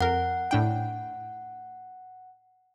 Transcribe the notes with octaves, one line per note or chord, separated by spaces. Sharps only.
F2 A#4 F#5
A2 D4 G5